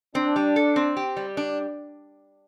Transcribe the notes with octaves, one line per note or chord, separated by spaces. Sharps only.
C4 D4
G3
A4
C4
G4
G3
D4